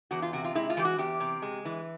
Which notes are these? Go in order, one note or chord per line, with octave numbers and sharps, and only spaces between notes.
E2 F#4
F4
C3 F#4
F4
G#3 E4
F4
E3 G4
F#4
E2 G4
C3
G#3
E3